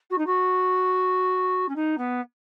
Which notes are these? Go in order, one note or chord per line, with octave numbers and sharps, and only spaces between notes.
F#4
D#4
F#4
C#4
D#4
B3